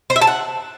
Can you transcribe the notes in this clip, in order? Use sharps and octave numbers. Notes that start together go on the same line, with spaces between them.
C5
E5
A5
F#5